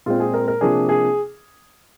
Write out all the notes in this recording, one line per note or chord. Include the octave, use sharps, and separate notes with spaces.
A#2 G#3 C4 F4
G#4
A#4
A#4
C3 F3 A#3 D4 G#4
G#4